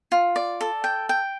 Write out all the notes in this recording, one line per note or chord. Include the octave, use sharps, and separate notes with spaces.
F4
D5
A4
G5
G5